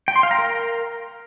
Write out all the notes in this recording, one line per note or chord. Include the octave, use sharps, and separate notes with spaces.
G5
C6
F5
A#5
A#4